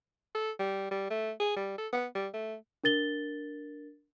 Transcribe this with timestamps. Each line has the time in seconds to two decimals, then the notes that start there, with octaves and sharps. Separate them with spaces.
0.35 A4
0.59 G3
0.91 G3
1.10 A3
1.40 G#4
1.56 G3
1.78 A4
1.93 B3
2.15 G3
2.33 A3
2.84 D4 A#4 A6 G7